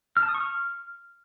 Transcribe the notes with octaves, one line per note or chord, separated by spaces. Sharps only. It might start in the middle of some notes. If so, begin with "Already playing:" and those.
F6
A5
D#6
C#6
F6